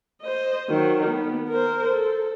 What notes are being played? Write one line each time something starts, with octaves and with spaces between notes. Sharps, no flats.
C5 D#5
D#3 F#3
B3
A#4 C5
A4